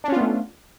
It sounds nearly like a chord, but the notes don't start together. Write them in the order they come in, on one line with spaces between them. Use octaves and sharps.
D4 C#4 F4 B3 A3